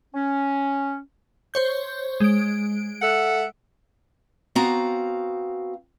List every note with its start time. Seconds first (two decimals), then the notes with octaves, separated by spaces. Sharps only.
0.14 C#4
1.54 C5 C#5 G6
2.20 G#3 D7
3.02 A4 E5 F#5
4.55 B3 C4 F#4 F5 A#5